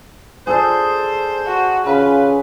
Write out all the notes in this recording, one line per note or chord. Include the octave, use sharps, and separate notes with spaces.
G#4 A4 C5 D5
F#4
C#3 F4 B4